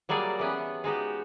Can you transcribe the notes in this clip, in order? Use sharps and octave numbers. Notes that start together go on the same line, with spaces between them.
F#3 G3 A#3 G#4 D5 D#5
E3 B3 C#4
G#3 D#4 F#4 G4